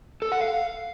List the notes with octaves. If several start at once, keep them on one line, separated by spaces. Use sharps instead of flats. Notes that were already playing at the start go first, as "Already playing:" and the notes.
A4
F#5
F5